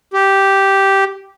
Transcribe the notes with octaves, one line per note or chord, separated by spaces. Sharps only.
G4